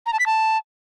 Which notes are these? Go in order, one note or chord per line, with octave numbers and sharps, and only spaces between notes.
A#5
A5
B6
A5